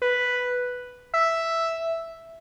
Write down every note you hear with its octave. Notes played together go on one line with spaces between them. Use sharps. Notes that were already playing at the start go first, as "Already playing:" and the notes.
B4
E5